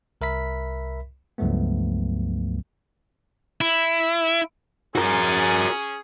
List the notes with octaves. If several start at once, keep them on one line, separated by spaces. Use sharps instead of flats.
C2 A#4 E5 B5 B6
C#2 G2 F3 F#3 A3 B3
E4
C#4 F#4 G#4 A#4